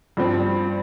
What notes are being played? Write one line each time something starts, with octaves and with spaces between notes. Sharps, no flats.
G2 F3 C4